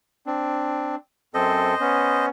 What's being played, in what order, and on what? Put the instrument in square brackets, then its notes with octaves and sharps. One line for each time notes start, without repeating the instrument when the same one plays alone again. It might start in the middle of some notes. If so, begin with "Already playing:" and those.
[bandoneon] C4 D4
[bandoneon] F#2 C4 A4 [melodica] C5 D#5
[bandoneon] B3 C#4